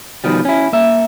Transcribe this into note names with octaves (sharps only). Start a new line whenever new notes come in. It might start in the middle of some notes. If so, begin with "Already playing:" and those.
B2 D#3 F3 G3
C#4 E4
A#3 E5